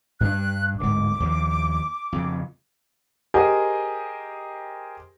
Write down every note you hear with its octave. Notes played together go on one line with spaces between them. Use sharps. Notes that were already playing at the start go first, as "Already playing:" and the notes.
G2 D4 F#6
D1 G#2 D6
D#2 F3
F2 C#3
G4 G#4 A#4 C5 D#5